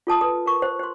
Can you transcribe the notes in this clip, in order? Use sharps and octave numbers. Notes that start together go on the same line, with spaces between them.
F4 A4 A5 D#6
A4 B4
A#4 C#6
C5
C5 C6